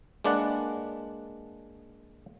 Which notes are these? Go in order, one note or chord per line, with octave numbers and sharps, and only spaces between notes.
G#3 A#3 D4 B4 D5 F#5